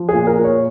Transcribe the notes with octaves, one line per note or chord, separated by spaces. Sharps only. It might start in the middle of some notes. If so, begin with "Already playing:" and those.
Already playing: F3
G#4
A#2
A#4
A#2
C#5